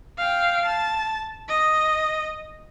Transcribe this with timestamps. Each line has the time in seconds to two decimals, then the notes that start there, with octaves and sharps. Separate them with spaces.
0.18 F5 G5
0.65 A5
1.49 D#5